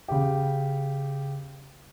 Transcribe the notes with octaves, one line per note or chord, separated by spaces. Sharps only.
C#3 G4